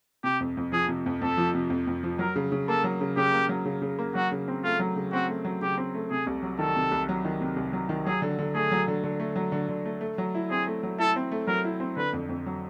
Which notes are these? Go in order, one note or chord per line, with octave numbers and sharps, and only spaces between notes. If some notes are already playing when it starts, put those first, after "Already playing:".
C3 G4
F2
F2
F3 G#4
C3
F2
F2 A4
F3
C3
F2
F2
F3
F#3 A#4
C#3
C#3
A#3 A4
F#3
C#3
C#3 G4
A#3
F#3
C#3
C#3
A#3
F#3 F#4
C#3
C4
A3 F4
F#3
C#3
C4 F#4
A3
F#3
C#3 G4
C4
A3
C3 G#4
C2
F#3
D#3 A4
C3
C2
F#3
D#3
C3
C2
F#3
D#3
F#3 G#4
D3
D3
A3 G#4
F#3
D3
D3
A3
F#3
D3
D3
A3
A3
F#3
E4
C4 G#4
A3
F#3
E4 A4
C4
A3
F#3 A#4
E4
C4
D3 B4
F2
F2
F#3